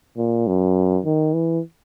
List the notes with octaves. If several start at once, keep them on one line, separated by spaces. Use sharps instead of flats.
A#2
F#2
D#3
E3